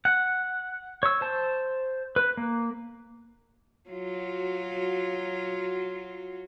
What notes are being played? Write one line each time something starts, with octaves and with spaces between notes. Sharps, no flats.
F#5
C#5 E6
C5 A5
B4
A#3
F#3 F4 F#4